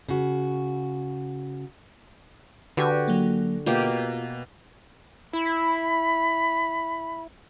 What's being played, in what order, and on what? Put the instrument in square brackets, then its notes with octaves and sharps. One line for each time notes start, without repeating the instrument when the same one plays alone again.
[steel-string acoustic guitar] C#3 F#4
[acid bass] D3 [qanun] F#4 G4 G#5 [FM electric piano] B4
[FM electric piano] F#3 A#3
[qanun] B2 A#3 G4 [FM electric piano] F4
[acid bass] E4 [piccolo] B5